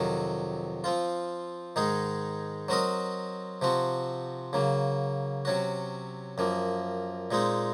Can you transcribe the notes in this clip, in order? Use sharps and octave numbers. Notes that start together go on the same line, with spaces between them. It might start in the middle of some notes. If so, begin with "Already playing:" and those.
Already playing: F2 C3 D#3 F#3
F3 C4 F4
G#2 D#3 G#3 D#4 G#4
F#3 C4 F#4 A#4 D#5
C3 F3 C4 F#4
C#3 F#3 A#3
C3 F#3 C#4 F#4
F#2 F3 A#3
A#2 G#3 C4 D#4